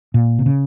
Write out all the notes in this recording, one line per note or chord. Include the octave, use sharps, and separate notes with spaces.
A#2
C3
C#3